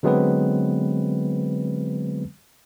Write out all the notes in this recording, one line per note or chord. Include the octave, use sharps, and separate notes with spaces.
D3 F#3 G#3 B3 C4 B4